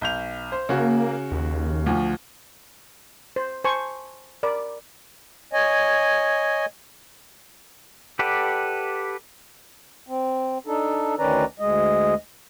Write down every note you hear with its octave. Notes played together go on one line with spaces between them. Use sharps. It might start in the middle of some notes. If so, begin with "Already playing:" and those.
B1 G6 F7
C5
C#3 A#3 F#4
D#2
D2 F3
C5
C5 G#5 A5 C#6
A#4 D5 B5
C#5 D#5 G#5
G4 A4 B4 D5 F#5
C4
D4 D#4 A4
D2 D#3 C#4 B4 D5 A#5
D2 G#3 D#5